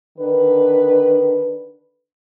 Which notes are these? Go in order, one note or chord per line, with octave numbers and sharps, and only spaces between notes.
D3 D#3 D4 B4